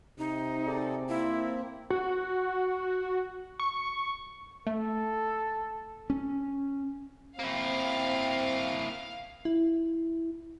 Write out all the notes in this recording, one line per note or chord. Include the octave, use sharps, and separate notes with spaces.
C3 D#4
G#4 A4 D5
A#3 C4 E4
F#4
C#6
A3 A4
C#4
A#3 C4 E4 F5
E4